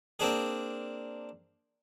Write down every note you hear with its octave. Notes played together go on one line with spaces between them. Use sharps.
A#3 C4 D4 G#4